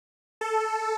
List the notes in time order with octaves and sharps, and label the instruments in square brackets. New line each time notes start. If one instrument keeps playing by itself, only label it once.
[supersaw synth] A4